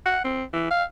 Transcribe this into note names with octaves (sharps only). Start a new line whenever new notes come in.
F#5
C4
E3
F5